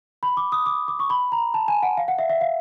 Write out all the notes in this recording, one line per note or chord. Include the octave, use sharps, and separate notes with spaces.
B5
D6
D#6
D6
D6
C#6
B5
A#5
A5
G#5
F#5
F5
F#5
E5
E5
F5